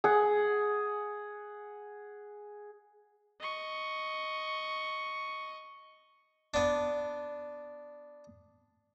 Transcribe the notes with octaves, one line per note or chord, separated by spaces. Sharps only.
G#4 F#5
D#5 C#6
B3 D4